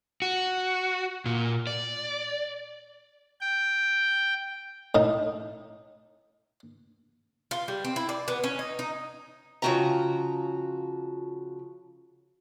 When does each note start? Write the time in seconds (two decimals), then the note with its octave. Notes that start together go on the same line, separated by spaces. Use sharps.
0.22 F#4
1.26 A#2
1.67 D5
3.41 G5
4.95 A2 D#4
7.51 F4
7.68 G3
7.85 C4
7.96 E4
8.09 D5
8.28 B3
8.44 C#4
8.59 D#4
8.79 D#4
9.62 C#3 F3 F#3 F#4 G5 A#5